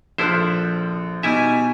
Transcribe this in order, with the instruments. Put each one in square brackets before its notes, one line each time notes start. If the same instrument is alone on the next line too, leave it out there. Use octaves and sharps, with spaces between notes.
[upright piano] A#1 A4 F#6 [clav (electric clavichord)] F3 E4 C5
[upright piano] B2 D#4 [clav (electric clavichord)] G3 E4 E5 [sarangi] G#5